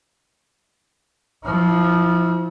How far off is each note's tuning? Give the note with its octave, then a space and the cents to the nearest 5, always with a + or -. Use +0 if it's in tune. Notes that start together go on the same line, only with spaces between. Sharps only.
F3 -5 E4 -40